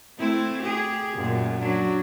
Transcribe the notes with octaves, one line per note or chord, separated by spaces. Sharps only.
A3 C4 E4
G4 G#4
F#2 A#2
F#3 D4